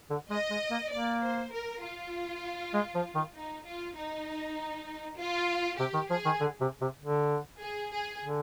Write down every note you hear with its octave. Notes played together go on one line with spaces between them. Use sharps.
D3
G#3 D#5
G#3
A#3
A#3 D5
C5
A#4
F4
G#3
F3
D#3
D#4
F4
D#4
F4
C3 G4
D#3
F3 G#4
D#3
D3
C3
C3
D3
G#4
G#4
D3